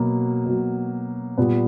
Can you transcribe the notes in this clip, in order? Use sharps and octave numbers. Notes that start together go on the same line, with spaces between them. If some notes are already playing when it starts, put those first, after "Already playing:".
Already playing: B2 F#3 A#3
B2 F#3
A#2 G3 B3